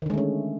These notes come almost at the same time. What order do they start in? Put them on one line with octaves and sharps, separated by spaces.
D#3 D3 G#3 A3 C#4